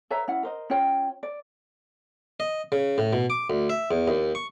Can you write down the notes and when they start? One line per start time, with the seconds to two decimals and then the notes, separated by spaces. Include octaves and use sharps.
0.11 B4 C#5 E5 A#5
0.28 C#4 E4 F#5
0.43 A#4 C5 D#5
0.70 C#4 F4 C#5 G5
1.23 D5
2.40 D#5
2.72 C#3
2.98 A2
3.13 B2
3.30 D6
3.50 D2
3.70 E5
3.91 E2
4.08 D#2
4.35 C#6